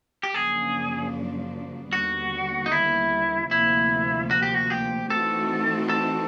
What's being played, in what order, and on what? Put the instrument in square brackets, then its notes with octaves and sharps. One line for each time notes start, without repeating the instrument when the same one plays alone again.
[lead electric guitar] G4
[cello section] F#2 C#3 F3 A#3 D4 [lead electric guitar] G#4
[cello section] D#2 D3 G3 B3 [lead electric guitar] F#4
[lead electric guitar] D#4
E4
[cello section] D2 C3 F3 A#3 [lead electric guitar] E4
[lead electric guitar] F#4
G4
F#4
G4
[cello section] E3 A3 C4 D#4 F#4 [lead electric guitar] A4
[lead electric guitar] A4